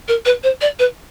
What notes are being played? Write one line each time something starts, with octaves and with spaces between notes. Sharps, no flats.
A#4
B4
C5
D5
B4